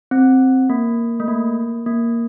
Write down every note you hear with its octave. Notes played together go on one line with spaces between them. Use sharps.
C4
A#3
A3
A#3
A#3